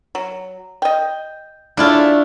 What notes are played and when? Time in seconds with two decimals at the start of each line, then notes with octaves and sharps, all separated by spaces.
0.15 F#3
0.82 D#5 G5
1.77 C#3 A3 D4 E4 F4